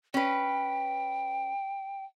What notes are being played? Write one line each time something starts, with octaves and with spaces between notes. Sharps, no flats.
C#4 B4 G5